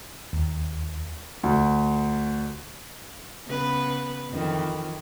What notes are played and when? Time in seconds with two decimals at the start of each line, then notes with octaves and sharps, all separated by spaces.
0.33 D#2
1.43 D2
3.47 C#3 B3 B4
4.30 F2 D#3 E3